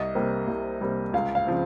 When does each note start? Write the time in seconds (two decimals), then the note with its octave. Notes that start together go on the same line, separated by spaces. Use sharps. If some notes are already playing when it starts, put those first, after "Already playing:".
Already playing: C2 D#5
0.15 C3 G3 A#3
0.48 C2
0.81 C3 G3 A#3
1.13 C#2 F5
1.35 F5
1.47 C#3 F3 C4